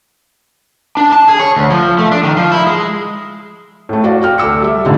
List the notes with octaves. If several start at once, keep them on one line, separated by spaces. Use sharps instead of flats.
D4
A5
G#4
C#5
D2
F3
A3
D4
D#3
F3
E4
G#3
A2 A3
F#4 D5 F5 F#5
F#4 G5 F6
D2 D6 E6 C#7
G3 E5
D#1 G#1 D3 D#4 F4